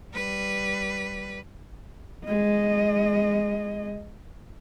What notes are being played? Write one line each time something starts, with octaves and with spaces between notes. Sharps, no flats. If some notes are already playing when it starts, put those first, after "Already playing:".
G3 B4
G#3 D#5